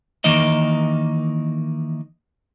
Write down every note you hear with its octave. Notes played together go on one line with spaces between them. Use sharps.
D#3 E3 A#3 D#4 D#5